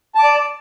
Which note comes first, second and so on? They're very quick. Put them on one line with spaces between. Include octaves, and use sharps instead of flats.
A5 D6 D5